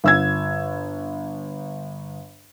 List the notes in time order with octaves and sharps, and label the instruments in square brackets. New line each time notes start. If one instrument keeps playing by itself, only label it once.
[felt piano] G1 E6 G#6